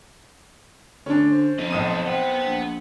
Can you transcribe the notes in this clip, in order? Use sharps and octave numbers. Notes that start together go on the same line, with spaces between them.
D3 C#4 D4
C5
F2 E4 D#5
B1 C3 A4 D#6 D#7
B3 C4 F#5
A#1